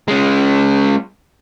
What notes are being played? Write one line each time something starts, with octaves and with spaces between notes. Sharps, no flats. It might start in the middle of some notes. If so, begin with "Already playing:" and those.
G#3 C#4